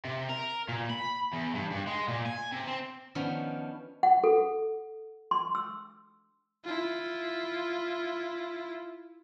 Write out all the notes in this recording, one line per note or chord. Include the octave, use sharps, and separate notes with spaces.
C3
A#4
A#2
B5
E2
G2
G2
G#3
A#2
G#5
C3
C4
D#3 F3 B3 C#4 D4
F#5
A4
C6
E6
E4 F4